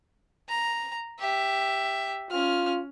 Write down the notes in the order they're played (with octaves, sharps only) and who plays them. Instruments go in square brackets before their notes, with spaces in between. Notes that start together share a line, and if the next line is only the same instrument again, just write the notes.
[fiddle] A#5
G4 E5
[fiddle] C#4 F6 [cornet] F4